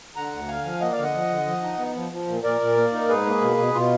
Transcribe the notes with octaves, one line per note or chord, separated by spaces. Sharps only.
D3 F#5 A#5
D2
D3 F5 G#5
F3
A#3 D#5 F#5
D5 F5
D3 D#5 F#5
F3
D3
F3
D#4
B3
F3
F3
A#2
A#2 A#4 D5
A#2
A#3
D#4
G#2 G#4 B4
A#3
B2
B2
B2 F4